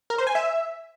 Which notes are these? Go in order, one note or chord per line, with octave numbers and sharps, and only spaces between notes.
A#4
C5
G#5
E5